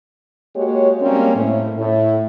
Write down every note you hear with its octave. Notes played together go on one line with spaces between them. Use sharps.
G#3 A#3 F#4 G4 C#5
G3 G#3 A#3 C4 C#4
A2
A2